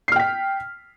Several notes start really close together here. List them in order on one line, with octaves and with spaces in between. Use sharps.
C7 F6 G5 B6